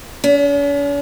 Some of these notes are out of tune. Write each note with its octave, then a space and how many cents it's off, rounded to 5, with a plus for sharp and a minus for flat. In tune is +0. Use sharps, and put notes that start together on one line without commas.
C#4 +45